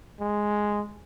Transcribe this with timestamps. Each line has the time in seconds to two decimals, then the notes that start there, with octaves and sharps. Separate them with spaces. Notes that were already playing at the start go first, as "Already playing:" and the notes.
0.20 G#3